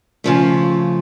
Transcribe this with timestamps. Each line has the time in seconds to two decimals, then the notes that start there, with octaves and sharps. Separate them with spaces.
0.24 C#3 F3 A3